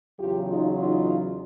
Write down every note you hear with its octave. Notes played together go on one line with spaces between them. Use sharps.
E2 C#3 F#3 F4 G4
D#4 F4
D#4 F4